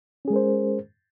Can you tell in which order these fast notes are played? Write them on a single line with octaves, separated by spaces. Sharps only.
C#4 G#4 G#3 A#4 C5